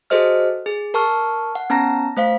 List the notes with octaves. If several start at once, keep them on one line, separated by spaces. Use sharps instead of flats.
F#4 G#4 A4 C5 D#5 F6
G#4
A#4 A5 C#6 F6
F#5
B3 C#4 A5 A#5 A#6
A3 C5 F5 B6